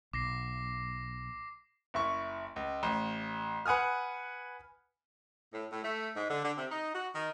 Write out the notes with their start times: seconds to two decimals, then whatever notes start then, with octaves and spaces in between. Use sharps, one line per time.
0.13 B1 D6 A#6 C7
1.94 F#1 E4 C#6
2.56 C#2
2.83 A1
3.66 B4 F#5 G#5 D#6 F6
5.53 A2
5.72 A2
5.84 A3
6.16 G#2
6.30 D3
6.44 D3
6.58 C3
6.71 D#4
6.95 F#4
7.15 D#3